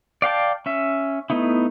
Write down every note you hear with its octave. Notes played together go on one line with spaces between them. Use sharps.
D5 F5 G5 A5
C#4 E5
A3 B3 D#4 E4